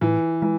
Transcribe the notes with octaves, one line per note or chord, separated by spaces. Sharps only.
A2 E3
E3 G#3